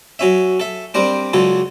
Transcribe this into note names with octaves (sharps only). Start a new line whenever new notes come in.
F#3 C#4 E5
A4 E5
G3 C4 D4 A#4
C#2 C#3 F#3 A4